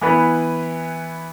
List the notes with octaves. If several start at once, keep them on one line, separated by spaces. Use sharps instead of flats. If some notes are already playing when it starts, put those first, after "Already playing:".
E3 B3 E4 B4